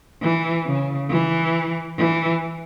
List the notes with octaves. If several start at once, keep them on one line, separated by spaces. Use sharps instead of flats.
E3
C#3
E3
E3